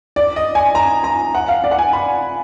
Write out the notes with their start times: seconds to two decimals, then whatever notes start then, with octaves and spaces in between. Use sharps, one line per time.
0.16 D5
0.36 D#5
0.55 G#5
0.75 A#5
1.04 A#5
1.35 F#5
1.48 F5
1.64 D5
1.71 F#5
1.79 G#5
1.93 B5